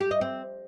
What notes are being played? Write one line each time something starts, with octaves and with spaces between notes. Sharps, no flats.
G4
D#5
C4